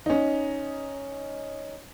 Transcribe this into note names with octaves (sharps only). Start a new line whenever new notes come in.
C#4 D#4